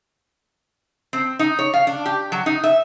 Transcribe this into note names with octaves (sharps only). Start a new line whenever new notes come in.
C4
D#4
C#5
F5
D4
G4
F#3
D#4
E5